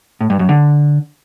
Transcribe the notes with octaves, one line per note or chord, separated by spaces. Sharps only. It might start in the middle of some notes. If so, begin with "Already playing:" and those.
A2
G2
F#2
D3